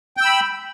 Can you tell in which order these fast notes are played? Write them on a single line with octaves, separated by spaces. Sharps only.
G5 E6 B5